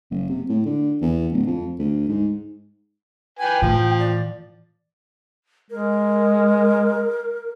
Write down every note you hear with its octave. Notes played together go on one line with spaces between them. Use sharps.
F#1
C3
A2
D3
E2
D1
F2
D2
G#2
B4 G5 G#5
A2 E3 F3
D5
G#3 A#4